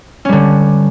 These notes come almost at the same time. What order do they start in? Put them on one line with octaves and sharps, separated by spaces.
C#4 G3 D3